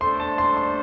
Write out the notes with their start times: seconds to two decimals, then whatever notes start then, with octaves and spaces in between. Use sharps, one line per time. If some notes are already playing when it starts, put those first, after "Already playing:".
0.01 A3 D4 A4 C5 C6
0.20 A5
0.38 C6
0.57 C6